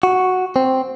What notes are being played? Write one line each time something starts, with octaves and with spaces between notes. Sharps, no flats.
F#4
C4